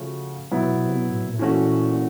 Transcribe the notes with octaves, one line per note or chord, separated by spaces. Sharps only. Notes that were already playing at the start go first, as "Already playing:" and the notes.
Already playing: C#3 F3 A3 C#4 F#4
B2 F#3 B3 E4
B2
B2
C3
B2
A2
A#2
A2
A#2 E3 A3 C#4 F#4